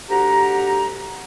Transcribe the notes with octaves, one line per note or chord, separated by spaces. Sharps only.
D2 G4 F#5 A#5